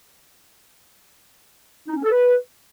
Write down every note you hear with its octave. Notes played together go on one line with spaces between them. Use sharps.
D#4
C#4
A4
B4